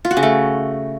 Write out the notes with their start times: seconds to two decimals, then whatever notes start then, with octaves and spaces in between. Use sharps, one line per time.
0.05 F4
0.11 F#4
0.17 C#3
0.23 A3